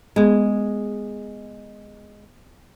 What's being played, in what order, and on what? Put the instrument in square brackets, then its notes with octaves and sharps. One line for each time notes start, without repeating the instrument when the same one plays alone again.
[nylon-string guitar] G#3 [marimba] B3 G#4